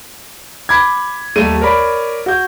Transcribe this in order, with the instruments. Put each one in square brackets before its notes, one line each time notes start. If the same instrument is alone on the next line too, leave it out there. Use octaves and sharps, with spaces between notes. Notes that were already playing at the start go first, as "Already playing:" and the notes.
[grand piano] B5 D6 G#6
D#2 G3 A3 D#7
A#4 C#5 D5 B5
F#4 G6